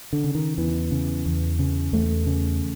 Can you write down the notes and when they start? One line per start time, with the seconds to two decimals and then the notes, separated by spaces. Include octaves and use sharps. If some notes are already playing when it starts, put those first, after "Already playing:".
0.13 D3
0.24 C#3
0.35 D#3
0.58 E2 E3
0.91 C#3
1.26 E2
1.59 C#3
1.93 E2 A3
2.26 C#3